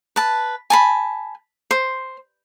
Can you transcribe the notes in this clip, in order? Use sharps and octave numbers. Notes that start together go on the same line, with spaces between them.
B4 A5
G#5 A5 B5
C5